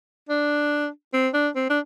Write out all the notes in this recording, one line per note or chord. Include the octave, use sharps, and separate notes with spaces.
D4
C4
D4
C4
D4